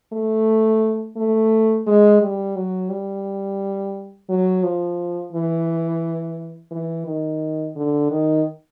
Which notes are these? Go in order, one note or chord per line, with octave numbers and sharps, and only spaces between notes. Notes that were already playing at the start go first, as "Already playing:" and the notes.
A3
A3
G#3
G3
F#3
G3
F#3
F3
E3
E3
D#3
D3
D#3